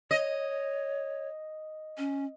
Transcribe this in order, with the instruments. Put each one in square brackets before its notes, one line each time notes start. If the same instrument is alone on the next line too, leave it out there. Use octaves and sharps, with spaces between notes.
[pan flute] C#5 [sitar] D#5
[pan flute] C#4